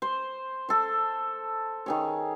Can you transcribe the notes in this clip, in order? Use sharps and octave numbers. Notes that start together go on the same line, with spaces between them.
C5
A4 C5
D#3 G#4 C#5